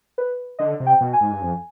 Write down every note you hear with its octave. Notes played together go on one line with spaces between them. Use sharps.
B4
D3 D#5
C3
G5
B2
G#5
G#2
G2
F2